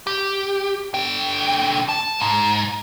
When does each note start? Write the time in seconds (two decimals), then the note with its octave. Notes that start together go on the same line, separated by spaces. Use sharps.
0.07 G4
0.94 D3 G5
1.89 A5
2.20 G#2